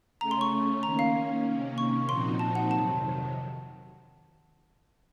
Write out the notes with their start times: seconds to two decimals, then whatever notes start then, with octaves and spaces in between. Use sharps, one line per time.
0.20 C#3 A3 C#4 A#5
0.31 C6
0.41 C#6
0.83 D#3 A#3 C#4 A#5
0.99 F5
1.46 C3 D#3 A#3 C#4
1.78 C#6
2.09 A#2 F3 C4 D#4 F#4 C6
2.39 A5
2.55 F#5
2.71 F2 C3 D#3 F#3 A5